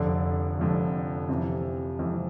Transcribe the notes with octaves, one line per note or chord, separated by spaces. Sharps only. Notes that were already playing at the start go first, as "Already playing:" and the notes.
Already playing: F1 F2 D3 D5
F1 F2 D3
F2 C3 E3
F2 C3 E3